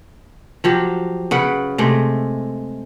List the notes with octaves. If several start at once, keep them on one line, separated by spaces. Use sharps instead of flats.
F3 F#3 G4
C#3 B4 F#5
C3 G#3 A3